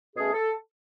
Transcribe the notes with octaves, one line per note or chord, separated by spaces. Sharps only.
B2 A3 C#4 G#4
A4